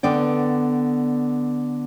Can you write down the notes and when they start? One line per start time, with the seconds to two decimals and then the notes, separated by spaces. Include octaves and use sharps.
0.03 D3 B3 D5 G5